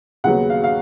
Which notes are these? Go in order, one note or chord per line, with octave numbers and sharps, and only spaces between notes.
D#2 C#3 F#3 B3 F#5
F5
F5